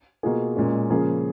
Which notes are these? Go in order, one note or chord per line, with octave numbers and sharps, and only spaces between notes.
B2 A#3 F4 G#4
A#2 G#3 C#4
C#3 F3 A#3 C#4 G#4